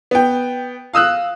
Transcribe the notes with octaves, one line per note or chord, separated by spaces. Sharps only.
B3 G5
F5 D#6 E6 F#6